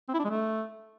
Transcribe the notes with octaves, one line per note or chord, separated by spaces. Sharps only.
C4
E4
D4
G#3
A3